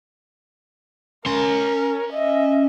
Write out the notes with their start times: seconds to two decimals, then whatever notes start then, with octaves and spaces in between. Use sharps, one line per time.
1.26 C#4 A#4 C6
2.13 D#5 E5